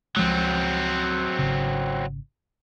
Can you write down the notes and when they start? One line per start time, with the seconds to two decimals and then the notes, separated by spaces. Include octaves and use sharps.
0.17 C#2 F3 F#3 G#3 C4
1.39 G#1 C#3